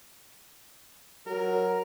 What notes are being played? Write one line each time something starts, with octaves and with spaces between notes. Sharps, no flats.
F#3 A#4